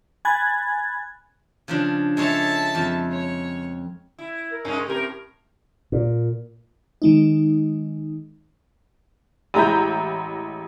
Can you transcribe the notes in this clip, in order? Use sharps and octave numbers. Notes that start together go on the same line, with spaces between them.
G#5 B5 F#6 G#6 A6
C#3 F3 D4
G#3 A4 C#5 E5 A5
F2
C#5
E4
A#4
G2 G#3 C#4
A2 C4 G4 A#4
A#2
D#3 G#3 D#4
A1 G#3 E4 A#5 B5 G6